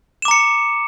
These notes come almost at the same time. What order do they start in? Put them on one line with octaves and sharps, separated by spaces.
E7 D6 A#5 C#7